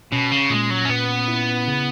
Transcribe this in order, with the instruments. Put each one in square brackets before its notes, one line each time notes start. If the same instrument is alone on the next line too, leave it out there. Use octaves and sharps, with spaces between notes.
[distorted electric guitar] B2 [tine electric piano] C#4
[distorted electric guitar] C#3
[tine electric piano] A#2 [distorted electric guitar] G#3
[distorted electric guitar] F#3
C#4
[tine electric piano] A#2 [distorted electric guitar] B3
[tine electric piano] E4
C#3